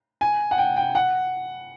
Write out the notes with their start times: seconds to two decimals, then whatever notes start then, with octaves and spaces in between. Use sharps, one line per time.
0.21 G#5
0.51 F#5
0.58 G5
0.76 G5
0.95 F#5